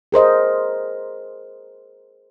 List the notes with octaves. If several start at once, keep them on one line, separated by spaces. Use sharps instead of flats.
G#4 A#4 C5 D#5